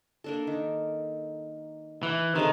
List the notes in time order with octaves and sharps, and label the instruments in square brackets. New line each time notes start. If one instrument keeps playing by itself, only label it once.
[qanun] A#3 D4 A4
D#3
[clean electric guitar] E3
[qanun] C3 G#3 A3 [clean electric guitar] D#3